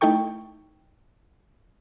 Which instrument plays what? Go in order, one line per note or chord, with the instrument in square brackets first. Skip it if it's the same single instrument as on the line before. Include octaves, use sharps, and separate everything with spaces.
[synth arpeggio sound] A3 D#4 E4 A4 G5 C#6